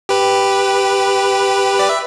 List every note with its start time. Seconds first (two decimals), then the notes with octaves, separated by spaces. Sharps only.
0.09 G4 B4
1.79 D5
1.89 E5